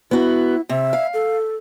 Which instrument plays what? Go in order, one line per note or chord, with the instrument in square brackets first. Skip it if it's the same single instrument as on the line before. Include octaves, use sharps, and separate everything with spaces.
[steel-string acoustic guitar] B3 F#4 [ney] E4
[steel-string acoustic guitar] C3 [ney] E5
[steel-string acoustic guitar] F5
[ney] A4